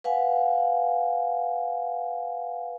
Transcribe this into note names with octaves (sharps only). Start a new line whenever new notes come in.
B4 F5 F#5 G#5